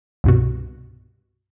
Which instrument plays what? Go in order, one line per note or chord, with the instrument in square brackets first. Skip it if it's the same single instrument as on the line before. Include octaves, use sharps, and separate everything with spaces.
[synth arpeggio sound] C2 G2 B2